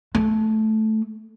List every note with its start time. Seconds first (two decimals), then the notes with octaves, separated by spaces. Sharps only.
0.15 A3